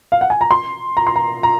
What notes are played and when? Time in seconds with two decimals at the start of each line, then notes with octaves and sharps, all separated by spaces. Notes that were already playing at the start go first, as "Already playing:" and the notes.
0.12 F5
0.21 F#5
0.30 G#5
0.41 A#5
0.51 C6
0.97 A#5
1.07 C6
1.16 A#5
1.43 A#5